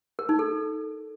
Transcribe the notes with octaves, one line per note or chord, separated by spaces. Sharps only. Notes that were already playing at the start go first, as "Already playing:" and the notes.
A#4
D#4
A4